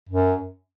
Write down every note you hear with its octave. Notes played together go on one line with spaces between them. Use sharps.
F#2